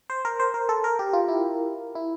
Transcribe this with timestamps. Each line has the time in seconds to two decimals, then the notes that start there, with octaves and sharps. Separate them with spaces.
0.10 C5
0.25 A#4
0.40 C5
0.54 A#4
0.69 A4
0.84 A#4
0.99 G4
1.13 F4
1.28 E4
1.95 E4